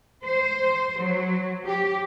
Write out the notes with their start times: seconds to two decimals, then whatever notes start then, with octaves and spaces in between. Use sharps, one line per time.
0.25 C5
1.02 F#3
1.64 G4